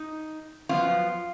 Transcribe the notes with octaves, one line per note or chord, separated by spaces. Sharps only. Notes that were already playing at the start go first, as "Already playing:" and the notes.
Already playing: D#4
F#2 F3 B3 F4